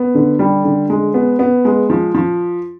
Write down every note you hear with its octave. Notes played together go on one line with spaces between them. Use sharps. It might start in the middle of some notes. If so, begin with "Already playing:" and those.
Already playing: B3
D3
G3
D3
G#3
B3
B3
G#3
F3
F3